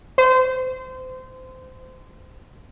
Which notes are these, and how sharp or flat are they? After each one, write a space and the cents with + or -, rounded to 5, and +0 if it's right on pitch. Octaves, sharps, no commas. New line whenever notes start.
C5 -25